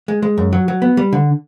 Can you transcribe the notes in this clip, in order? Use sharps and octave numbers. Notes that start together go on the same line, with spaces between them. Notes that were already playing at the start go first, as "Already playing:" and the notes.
G#3
G#3
F#2
F#3
F#3
B3
G3
D3